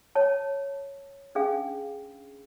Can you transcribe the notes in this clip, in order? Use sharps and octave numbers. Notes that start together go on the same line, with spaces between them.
C#5 A5
C#4 D4 G#4 F5